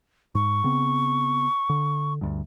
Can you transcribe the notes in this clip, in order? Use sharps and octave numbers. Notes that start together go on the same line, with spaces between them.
G#2 C#6
C#3 B3 C4
D3
D2 G2